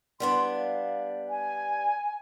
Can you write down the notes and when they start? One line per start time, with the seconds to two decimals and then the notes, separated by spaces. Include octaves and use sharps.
0.20 G3 B3 D4 C6
0.55 F5
1.29 G#5